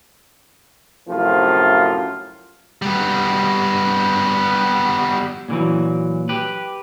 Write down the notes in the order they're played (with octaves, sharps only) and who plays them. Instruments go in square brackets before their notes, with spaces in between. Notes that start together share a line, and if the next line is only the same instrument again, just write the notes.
[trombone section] F#2 A2 C3 F3 F4
[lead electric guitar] G3 B3
[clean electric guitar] A#2 D3 E3 F#3
G4 B4